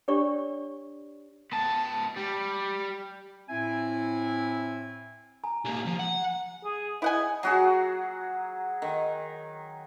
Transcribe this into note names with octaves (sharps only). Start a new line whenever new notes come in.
D4 G4 C#5 D5 C#6
B3 A5
G3
A2 C4 E4 E5 G#5
G#5 A#5
G3 A#3
F3
F#5
G#4
E4 D#5 F#5 G#5
F#3 F#4 G#4
D#3